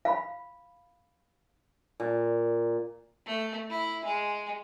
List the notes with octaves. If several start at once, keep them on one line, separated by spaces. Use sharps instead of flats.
F5 B5
A#2
A3
E4
G#3